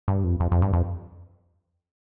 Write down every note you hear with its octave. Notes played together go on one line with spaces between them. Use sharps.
G2
F2
F2
F2
G2
F2